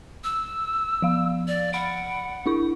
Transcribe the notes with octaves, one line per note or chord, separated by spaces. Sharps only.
E6
F3 F5
D5
F#5 B5 D7
D4 E4 C#6